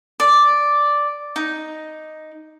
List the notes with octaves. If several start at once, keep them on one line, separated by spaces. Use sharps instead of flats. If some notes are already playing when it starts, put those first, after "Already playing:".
D5
D#4